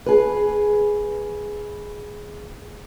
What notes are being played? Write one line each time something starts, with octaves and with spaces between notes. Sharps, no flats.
G#4 B4